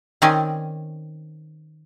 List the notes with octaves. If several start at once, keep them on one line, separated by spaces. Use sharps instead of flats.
D#3 C4 C#4 D5 D#5 G#5